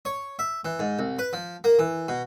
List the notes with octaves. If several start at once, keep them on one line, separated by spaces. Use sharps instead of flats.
C#5
E5
E3
G#2
C2
B4
F3
A#3
E3
B2